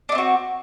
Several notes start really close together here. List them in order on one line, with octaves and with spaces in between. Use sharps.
D4 D#4 C4 F#4